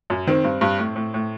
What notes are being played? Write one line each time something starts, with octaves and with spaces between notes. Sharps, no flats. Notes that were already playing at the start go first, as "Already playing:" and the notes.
F#2
D#3 C4
G2
G2
A2
A2
A2